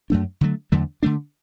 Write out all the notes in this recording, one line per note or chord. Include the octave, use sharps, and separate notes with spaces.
F#2 F#3 A3 D4
D3 F#3 A3
E2 D3 F#3 A3
D3 A3 D4